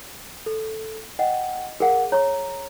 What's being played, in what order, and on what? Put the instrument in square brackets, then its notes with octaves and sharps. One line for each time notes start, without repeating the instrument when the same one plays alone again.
[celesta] A4
[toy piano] D#5 [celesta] F#5 G5
[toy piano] G#4 F5 [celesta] A#4 F#5
[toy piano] C#5 C#6 [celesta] A#5